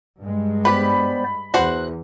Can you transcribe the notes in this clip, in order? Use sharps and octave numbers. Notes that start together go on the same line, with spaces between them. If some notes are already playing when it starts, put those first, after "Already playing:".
G2 G#3
B3 G4 B4 C5 D5 B5
E2 F#4 C5 F#5 F#6